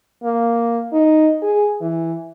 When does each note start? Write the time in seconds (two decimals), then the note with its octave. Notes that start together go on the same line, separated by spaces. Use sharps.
0.23 A#3
0.93 D#4
1.42 G#4
1.81 E3